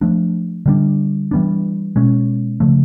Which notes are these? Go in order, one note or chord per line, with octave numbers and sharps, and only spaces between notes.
F3 A3 D4
D3 G3 B3 D4
E3 G3 B3 D4
B2 G#3 C#4
C#3 F3 A3